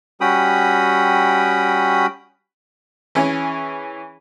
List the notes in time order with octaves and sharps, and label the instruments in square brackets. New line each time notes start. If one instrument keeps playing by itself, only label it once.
[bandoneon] G3 C#4 F#4 G5 B5 D#6
[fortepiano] E3 C#4 G#4 C#5